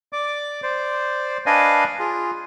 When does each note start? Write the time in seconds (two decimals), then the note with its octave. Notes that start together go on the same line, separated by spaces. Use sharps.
0.13 D5 D6
0.63 C5 D5
1.46 D4 B4 D5 D#5 F5 G#5
1.99 F4 G#4